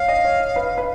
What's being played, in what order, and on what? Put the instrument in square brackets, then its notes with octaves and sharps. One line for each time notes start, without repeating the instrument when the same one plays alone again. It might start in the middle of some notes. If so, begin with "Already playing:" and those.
Already playing: [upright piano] C#5 [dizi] F5
[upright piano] D#5
C#5
C#5
B4
B4